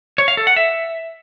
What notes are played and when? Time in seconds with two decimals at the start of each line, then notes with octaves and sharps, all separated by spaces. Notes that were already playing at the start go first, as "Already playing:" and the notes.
0.18 C#5
0.28 F5
0.37 A4
0.47 F#5
0.56 E5